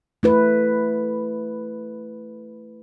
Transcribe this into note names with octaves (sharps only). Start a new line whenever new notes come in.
A3 E4 B4